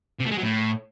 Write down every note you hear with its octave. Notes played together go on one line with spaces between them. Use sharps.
C3
A3
G#3
F#3
A2